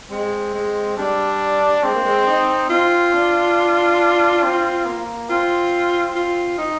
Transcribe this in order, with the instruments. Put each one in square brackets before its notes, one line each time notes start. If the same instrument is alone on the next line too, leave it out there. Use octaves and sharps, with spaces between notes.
[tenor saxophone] G#3 [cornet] C4
[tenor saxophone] G#3
[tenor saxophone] G3 [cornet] D4
[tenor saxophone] G#3 [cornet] C4
[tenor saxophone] A#3
G#3
D#4
[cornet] C4 [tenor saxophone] F4
[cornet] D4
C4
A#3
[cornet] C4 [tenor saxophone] F4
[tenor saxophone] F4
D#4